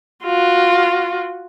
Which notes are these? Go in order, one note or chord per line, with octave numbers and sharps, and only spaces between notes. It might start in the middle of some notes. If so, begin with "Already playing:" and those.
F4 F#4